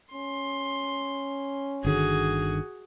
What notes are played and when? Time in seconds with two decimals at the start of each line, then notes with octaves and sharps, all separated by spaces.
0.14 C#4 C6
1.85 G1 D3 D#3 F#4 G#4